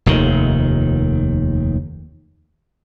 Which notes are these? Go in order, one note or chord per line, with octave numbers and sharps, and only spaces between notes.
F1 D#2 D#3